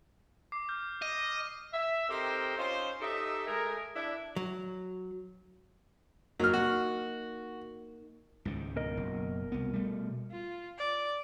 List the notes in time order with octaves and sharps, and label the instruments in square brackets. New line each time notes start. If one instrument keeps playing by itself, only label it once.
[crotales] D6 C7
F6 G6
[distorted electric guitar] D#5
[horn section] E5
C4 D#4 G4 A4 A#4 C5
C#4 D#4 F4 C5
D#4 G4 A4 D#5 E5
G#3 A3 G#4 A#4
D4 E4 E5
[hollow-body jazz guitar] F#3
[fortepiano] F#3 F6 [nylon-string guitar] A#3 D#4
[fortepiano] F#4
[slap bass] C#2 G#2 D#3
[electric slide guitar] B2 A#4 D#5
[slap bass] F#1
C2 B3
G3 A3
[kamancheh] F4
D5